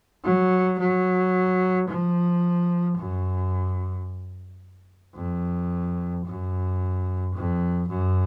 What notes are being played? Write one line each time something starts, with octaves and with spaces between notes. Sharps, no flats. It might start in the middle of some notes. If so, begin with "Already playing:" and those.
F#3
F#3
F3
F#2
F2
F#2
F2
F#2